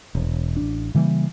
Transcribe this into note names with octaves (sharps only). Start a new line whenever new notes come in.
E1
A1 D4
C#3 E3 G3 A#3